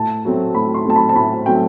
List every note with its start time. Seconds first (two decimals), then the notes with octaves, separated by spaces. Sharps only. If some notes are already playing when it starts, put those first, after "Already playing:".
Already playing: A2 A5
0.25 F#3 A3 C4
0.55 A2 B5
0.74 C6
0.85 F#3 A3 C4 A5
0.96 B5
1.09 A5
1.16 A2 B5
1.46 F#3 A3 C4 G5